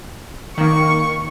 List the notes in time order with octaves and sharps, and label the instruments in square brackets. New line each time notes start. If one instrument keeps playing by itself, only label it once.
[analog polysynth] D#3 A#3 [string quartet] C#6